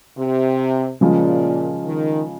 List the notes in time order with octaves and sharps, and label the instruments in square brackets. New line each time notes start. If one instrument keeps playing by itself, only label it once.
[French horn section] C3
[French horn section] A#2 [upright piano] C#3 F3 G#3
[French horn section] D#3